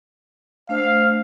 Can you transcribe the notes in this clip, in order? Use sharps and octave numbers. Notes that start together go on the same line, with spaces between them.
A3 D4 C5 F5